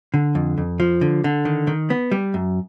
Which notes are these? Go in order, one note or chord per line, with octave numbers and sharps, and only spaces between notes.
D3
F2
F2
F3
D3
D3
D#3
D#3
B3
G3
F#2